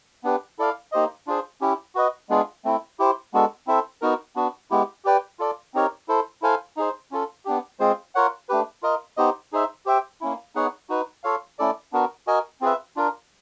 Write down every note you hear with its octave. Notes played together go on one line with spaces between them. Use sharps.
B3 D4 G4 B4
E4 A4 D5 F5
A#3 D#4 G4 C5 D#5
D4 F4 G#4 C5
C#4 E4 G4
F#4 B4 D#5
G#3 B3 D4 F4 G#4
A3 C4 E4
E4 G4 C5
G#3 B3 D4 F#4 A4
C4 E4 A4 C5 E5
B3 D#4 F#4 A#4
B3 D4 F#4
G#3 B3 E4 G4
G4 B4 D5 G5
F4 A4 D5
C4 D#4 G4 A#4 C#5
E4 A4 C5
E4 A4 C5 F5 G#5
D#4 G#4 C5
C#4 F4 A4
B3 D4 G4
G#3 C4 F4 G#4 C5
F4 A#4 C#5 F#5
A3 D4 G4 B4
F4 A#4 D#5
B3 D#4 G4 C5 D#5
D#4 G#4 C5 E5
G4 C5 E5 G5
A#3 C#4 E4
B3 D#4 G#4 C#5 F#5
D#4 F#4 B4
F4 A4 C#5 F5
A3 C#4 E4 A4 D5
B3 D4 F#4 A#4
F#4 A#4 D#5 G#5
C4 F4 G#4 B4 E5
D4 F4 A#4